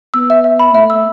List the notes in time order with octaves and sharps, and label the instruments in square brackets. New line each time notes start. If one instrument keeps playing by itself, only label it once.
[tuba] B3 [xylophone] E6
[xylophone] E5
E5
B5
[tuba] A3 [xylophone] E5
[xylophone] E6